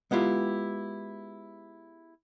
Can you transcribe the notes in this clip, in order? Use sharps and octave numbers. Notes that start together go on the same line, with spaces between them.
G#3 B3 E4 F4 G4